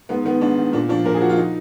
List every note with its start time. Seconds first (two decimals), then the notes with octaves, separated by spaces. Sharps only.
0.09 G#2 B3
0.25 D#3 B3
0.41 G#2 D4
0.58 D#3
0.73 A#2 D4
0.89 F3 D4
1.05 A#2 A#4
1.14 G#4
1.20 F3 F#4
1.29 F4
1.37 D#4